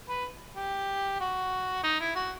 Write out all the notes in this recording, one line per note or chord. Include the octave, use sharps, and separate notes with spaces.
B4
G4
F#4
D#4
E4
F#4